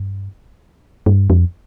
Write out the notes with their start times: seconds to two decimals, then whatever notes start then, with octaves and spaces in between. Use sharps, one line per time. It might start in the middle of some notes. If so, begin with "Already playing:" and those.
Already playing: G2
1.06 G2
1.30 F2